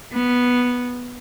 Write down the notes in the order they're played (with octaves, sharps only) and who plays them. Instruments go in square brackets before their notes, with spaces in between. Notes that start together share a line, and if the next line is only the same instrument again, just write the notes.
[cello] B3